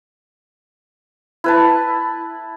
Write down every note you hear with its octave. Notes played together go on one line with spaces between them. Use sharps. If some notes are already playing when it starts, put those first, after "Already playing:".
E4 B4 A5